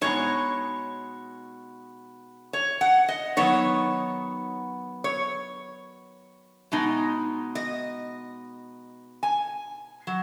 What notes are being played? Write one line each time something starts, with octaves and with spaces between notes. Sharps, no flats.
B2 G#3 D#4 C#5
C#5
F#5
D#5
D#3 F#3 B3 D#4 C#5
C#5
B2 G#3 D#4
D#5
G#5
F#3